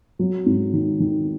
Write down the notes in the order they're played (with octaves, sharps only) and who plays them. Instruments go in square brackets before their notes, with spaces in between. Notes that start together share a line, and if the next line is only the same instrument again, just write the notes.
[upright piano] F#3
G#2
D#3
D#3